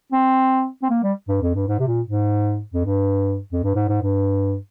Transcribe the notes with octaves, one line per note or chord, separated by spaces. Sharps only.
C4
C4
A#3
G3
G2
F2
G2
G#2
C3
A#2
G#2
F2
G2
F2
G2
G#2
G#2
G2